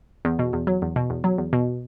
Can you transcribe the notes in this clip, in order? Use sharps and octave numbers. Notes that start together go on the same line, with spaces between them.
E2
B2
E2
F#3
E2
B2
E2
F#3
E2
B2